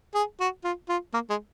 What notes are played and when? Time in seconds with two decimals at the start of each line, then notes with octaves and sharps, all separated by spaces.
0.15 G#4
0.40 F#4
0.64 F4
0.89 F4
1.14 A#3
1.30 G#3